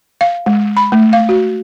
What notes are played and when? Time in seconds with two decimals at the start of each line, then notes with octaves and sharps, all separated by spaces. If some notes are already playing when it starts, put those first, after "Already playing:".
0.21 F5
0.46 G#3
0.77 B5
0.92 A3
1.13 F5
1.29 F#4